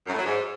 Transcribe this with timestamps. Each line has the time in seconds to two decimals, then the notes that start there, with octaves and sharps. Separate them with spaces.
0.07 F#2
0.13 A2
0.18 F#3
0.24 G#2